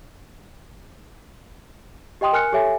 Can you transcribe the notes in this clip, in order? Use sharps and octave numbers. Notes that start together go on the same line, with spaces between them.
G4 D#5 G5 C6 D#6
A#4 G#5 F6 F#6 C#7
G4 A4 C#5 E5 G#5